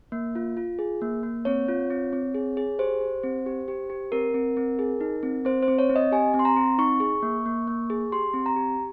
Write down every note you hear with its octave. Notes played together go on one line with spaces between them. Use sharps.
A#3
F4
F4
G#4
A#3
A#3
C4 C#5
F4
C4
C4
G#4
G#4
G4 C5
G4
C4
G4
G4
G4
C4 A#4
C4
C4
G#4
D#4
C4
C4 C5
C5
C4
C#5
C4
D#5
G4 G#5
C4
C6
A#5
C4
D#4 C#6
G#4
A#3
A#3
A#3
G#4
G4 C6
C4
A#5
G4